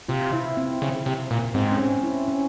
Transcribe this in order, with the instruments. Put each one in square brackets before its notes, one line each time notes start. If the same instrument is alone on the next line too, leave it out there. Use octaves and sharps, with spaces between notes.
[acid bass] C3 [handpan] F4
[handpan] E4
C4
[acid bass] C#3
C3
A#2
[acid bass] G#2 [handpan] C4
[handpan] C#4
C4
E4
C#4